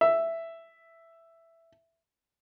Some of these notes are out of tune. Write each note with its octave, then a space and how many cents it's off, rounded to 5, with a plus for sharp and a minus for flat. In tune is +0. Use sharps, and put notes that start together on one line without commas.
E5 +5